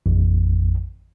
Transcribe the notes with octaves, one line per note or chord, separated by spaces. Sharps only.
A1 F2